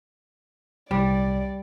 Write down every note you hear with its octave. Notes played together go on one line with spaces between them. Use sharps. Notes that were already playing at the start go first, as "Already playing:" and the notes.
C2 G3 D5